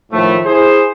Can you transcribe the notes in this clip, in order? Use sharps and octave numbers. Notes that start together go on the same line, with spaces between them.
A2 D#3 F3 A3
E4 G#4 C5